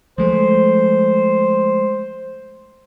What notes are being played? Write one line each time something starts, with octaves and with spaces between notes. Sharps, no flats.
F3 G#3 A3 C5